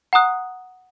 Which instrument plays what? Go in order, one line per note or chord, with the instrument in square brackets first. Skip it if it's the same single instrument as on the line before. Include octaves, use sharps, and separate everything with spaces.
[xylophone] F#5 A#5 D#6 F#6